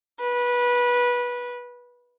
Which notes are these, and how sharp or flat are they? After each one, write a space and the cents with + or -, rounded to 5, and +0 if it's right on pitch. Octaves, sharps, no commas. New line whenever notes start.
B4 -20